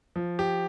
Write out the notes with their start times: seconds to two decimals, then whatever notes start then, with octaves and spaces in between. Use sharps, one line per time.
0.16 F3
0.39 G4